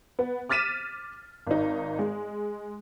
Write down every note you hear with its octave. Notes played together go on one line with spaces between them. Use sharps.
B3
D6 F6 A6 B6 D#7 E7
G#1 D#4
G#3